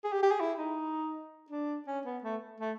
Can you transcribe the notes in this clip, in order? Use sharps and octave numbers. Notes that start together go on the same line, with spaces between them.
G#4
G4
G4
G#4
E4
D#4
D4
C#4
B3
A3
A3